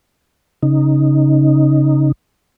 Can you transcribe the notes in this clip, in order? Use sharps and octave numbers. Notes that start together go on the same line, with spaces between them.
C#3 D#4